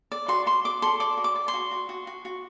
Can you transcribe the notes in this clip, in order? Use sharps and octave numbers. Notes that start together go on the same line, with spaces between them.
D5
F#4 C6
F#4 C6
D5 D6
A4 C6
D5 D6
F#4
D6
D5
C6
F#4
F#4
F#4
F#4
F#4